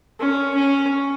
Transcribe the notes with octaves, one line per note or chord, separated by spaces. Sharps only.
C#4
C#4